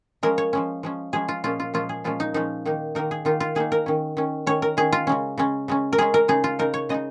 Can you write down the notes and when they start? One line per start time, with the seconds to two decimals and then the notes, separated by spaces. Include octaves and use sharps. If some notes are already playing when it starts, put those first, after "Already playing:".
0.23 F3 G#3 C#4 A#4
0.38 C#5
0.53 F3 G#3 C#4
0.83 F3 G#3 C#4
1.13 F3 G#3 C#4 G#4
1.28 F4
1.44 A#2 F3 G#3 C#4 F4
1.60 F4
1.74 A#2 F3 G#3 C#4 F4
1.89 G#4
2.04 A#2 F3 G#3 C#4 F4
2.20 D#4
2.34 A#2 F3 G#3 C#4 D#4
2.66 D#3 A#3 D#4
2.95 D#3 A#3 D#4 A#4
3.11 G#4
3.25 D#3 A#3 D#4 F4
3.40 F4
3.55 D#3 A#3 D#4 G#4
3.72 A#4
3.86 D#3 C#4
4.17 D#3 C#4
4.46 D#3 C#4 C#5
4.62 A#4
4.77 D#3 C#4 G#4
4.92 F4
5.07 C#3 G#3 C#4
5.38 C#3 G#3 C#4
5.68 C#3 G#3 C#4
5.93 A#4
5.98 C#3 G#3 C#4 G#4
6.14 A#4
6.28 C#3 G#3 D#4 G#4
6.44 F4
6.59 C#3 G#3 D#4 A#4
6.74 C#5
6.89 C#3 G#3 D#4 D#5